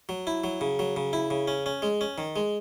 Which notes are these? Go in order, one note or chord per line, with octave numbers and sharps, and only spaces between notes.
F#3
E4
F#3
C#3
F#3
C#3
E4
C#3
C#4
C#4
G#3
C#4
D#3
G#3